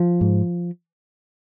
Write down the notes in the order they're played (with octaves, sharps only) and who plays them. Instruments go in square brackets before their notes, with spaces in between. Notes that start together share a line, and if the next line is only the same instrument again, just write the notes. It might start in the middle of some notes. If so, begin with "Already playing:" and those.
Already playing: [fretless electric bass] F3
G#2